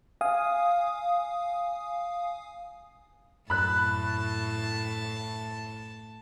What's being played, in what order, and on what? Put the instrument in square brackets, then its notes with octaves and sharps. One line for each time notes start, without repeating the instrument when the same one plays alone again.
[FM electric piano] F5 G#5 D#6
[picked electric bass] F#2 [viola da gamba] A2 [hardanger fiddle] A5 [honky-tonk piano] B5 F#6